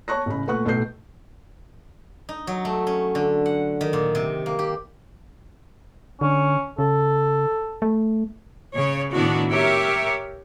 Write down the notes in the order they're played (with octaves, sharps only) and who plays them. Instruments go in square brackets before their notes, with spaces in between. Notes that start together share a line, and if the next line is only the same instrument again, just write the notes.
[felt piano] C#5 A5 C#6 F#6 A#6
A1 C#3 B5
A#2 A3 B4 F#5 C#6 F#6
B1 A2 A4 B4 G6 C7
[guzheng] D#4
F#3
A3
C#4
D3
F#5
D#3
A#2
C3
A#3
G4
[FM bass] D3 [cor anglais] C#4
[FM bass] C#3 [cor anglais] A4
[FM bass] A3
[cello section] C#3 C#5
A2 D#3 B3 D4 E4 F#4
G4 A#4 C#5 E5